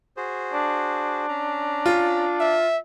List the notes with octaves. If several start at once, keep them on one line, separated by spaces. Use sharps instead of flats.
F#4 G#4 C5
D4
C#4 A#5
F4
E5